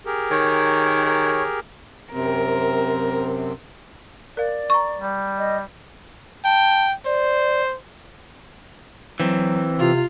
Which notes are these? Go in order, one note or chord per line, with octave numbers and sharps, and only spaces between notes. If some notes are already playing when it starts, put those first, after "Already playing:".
G4 G#4 A#4
D#3 C#5
F#2 C3 C4 A#4
A#4 D5 F5
A#5 C#6
G3
D#5
G5 A5
C5 D5
E3 F#3 C4
C3 F4